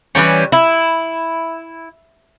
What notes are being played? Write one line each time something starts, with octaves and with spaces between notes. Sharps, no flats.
E3 F3 G3 C#4
E4